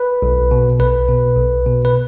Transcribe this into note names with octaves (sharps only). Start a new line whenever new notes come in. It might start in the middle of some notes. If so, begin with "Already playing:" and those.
Already playing: B4
B1
B2
B1 B4
B2
B1
B2
B4